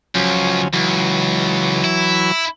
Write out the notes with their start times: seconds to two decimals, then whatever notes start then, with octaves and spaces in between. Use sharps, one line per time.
0.15 C#2 F3 F#3 C#4
0.73 C#2 E3 F#3
1.84 E4